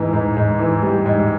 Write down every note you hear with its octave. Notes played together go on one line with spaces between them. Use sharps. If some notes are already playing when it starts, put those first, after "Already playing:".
Already playing: G#2 E3
G#2
G#2
E3
G3
G#2